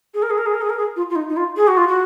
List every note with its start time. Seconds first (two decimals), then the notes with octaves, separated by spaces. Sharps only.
0.14 G#4
0.23 A#4
0.30 G#4
0.38 A#4
0.46 G#4
0.54 A#4
0.61 G#4
0.70 A#4
0.78 G#4
0.96 F4
1.10 F4
1.16 D#4
1.29 D#4
1.37 F4
1.57 G#4
1.68 F#4
1.77 F4
1.88 F#4